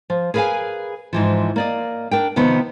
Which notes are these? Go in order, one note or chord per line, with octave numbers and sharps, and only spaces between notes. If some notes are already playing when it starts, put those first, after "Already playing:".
F3
G#4 A#4 B4 D#5 F5 G#5
G#2 E3 F3
A#3 D5 D#5
D4 A#4 G5
C3 D#3 F3 B3